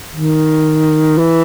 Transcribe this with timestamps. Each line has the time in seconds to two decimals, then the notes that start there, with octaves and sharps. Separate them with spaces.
0.12 D#3
1.18 E3